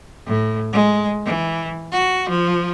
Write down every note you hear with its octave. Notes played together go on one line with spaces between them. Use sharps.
A2
G#3
E3
F#4
F3